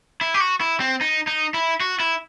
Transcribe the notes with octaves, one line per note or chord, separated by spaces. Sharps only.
E4
G4
F#4
E4
C4
D#4
D#4
E4
F#4
E4